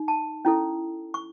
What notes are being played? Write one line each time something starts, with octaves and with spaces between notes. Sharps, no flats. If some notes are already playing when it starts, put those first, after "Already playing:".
Already playing: D#4
A5
C#4 E4 A4
C#6